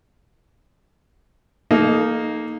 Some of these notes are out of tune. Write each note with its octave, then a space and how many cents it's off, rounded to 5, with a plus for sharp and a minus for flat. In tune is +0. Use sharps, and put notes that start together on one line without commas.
A#3 +0 D#4 +0 A4 -35